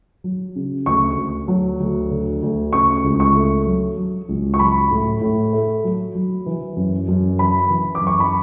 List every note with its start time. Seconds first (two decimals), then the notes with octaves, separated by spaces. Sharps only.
0.24 F#3
0.56 C#3
0.86 D2 C#6
1.18 D2
1.48 F#3
1.80 D2
2.11 D3
2.42 D2
2.73 C#3 C#6
3.04 C#2
3.20 C#6
3.35 A3
3.66 F#3
3.97 F#3
4.29 C#2
4.54 C#6
4.59 F#3 B5
4.91 A2
5.21 A2
5.53 A3
5.84 F#3
6.15 F#3
6.46 E3
6.77 F#2
7.08 F#2
7.39 E3 B5
7.70 E3
7.95 D6
8.01 F#2
8.07 C#6
8.20 B5